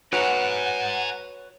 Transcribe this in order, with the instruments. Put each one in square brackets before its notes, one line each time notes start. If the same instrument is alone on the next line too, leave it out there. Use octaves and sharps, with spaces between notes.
[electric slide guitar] F#4 B4 C#5 [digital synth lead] F#5 [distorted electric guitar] G#5 A#5